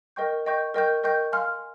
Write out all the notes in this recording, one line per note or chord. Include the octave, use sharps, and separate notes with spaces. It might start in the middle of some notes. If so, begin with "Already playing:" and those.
A#4 D#5 G5 C#6 G6
A#4 D#5 G5 C#6 G6
A#4 D#5 G5 C#6 G6
A#4 D#5 G5 C#6 G6
F5 G#5 C6 F6